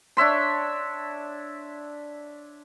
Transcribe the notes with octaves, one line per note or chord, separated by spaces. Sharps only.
D4 C#5 E5 C6